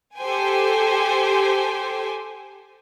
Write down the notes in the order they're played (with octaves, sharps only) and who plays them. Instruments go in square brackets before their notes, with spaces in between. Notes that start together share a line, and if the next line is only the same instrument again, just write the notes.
[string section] G4 A4 C5 G5 G#5